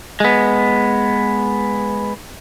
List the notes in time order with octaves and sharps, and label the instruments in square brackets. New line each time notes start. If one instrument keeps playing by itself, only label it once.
[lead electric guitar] G#3 B3